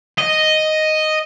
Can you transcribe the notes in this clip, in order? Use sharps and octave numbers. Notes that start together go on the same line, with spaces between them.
D#5